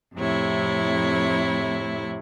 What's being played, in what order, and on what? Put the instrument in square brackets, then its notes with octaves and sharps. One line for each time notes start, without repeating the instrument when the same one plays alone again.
[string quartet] F2 A2 C3 E4 C#5